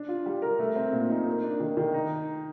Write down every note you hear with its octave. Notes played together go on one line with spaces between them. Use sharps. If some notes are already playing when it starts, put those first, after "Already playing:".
Already playing: D4
F4
G3
A#4
A3
C4
A#2
D#4
A#3
D4
D#3
D#3
D#4